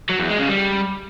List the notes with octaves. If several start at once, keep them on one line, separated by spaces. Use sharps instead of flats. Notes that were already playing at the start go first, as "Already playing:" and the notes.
F#3
E2
G#3
C#3
G3